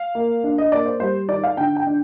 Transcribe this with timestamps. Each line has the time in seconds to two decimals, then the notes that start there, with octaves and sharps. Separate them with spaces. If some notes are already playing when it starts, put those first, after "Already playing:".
Already playing: F5
0.15 A#3
0.44 D4
0.58 D#5
0.72 A#3 D5
0.86 C5
1.00 G3 C5
1.29 D#3 D5
1.44 F5
1.57 D3 G5
1.76 G5
1.87 D4